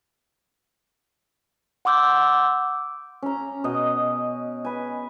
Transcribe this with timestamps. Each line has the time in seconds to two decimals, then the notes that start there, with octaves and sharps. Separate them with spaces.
1.85 F#5 C6 D6 E6 G6
3.23 C#4 A#5
3.64 B2 D#5
4.65 B4 G#5